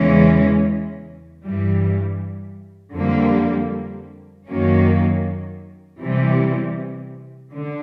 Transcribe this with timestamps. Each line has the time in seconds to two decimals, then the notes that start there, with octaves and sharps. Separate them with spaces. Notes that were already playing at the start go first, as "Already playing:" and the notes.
Already playing: E2 C#3 E3 G#3 C#4
1.43 G2 E3 G3
2.95 F2 D3 G3 A#3
4.48 F#2 D#3 F#3 A#3 C#4
6.00 C3 E3 G3
7.52 D3